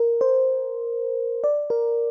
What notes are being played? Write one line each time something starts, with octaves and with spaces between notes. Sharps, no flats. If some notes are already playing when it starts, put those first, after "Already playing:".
Already playing: A#4
C5
D5
A#4